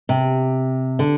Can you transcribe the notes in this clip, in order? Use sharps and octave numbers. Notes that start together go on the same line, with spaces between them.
C3
D3